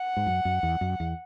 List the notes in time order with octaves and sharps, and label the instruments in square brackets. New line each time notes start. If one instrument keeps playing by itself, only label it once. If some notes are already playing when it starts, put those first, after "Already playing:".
Already playing: [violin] F#5
[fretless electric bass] G#2
F#2
F#2
E2
F#2
E2